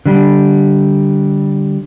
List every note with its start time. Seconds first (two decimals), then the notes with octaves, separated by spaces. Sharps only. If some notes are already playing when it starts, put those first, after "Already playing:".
0.06 D3 G3